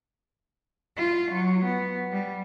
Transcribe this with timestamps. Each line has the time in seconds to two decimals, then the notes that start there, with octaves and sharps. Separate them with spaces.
0.98 F4
1.32 F#3
1.65 B3
2.12 G3